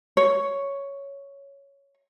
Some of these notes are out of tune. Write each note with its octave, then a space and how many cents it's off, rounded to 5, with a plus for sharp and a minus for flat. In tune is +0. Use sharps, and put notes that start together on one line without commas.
C#5 +5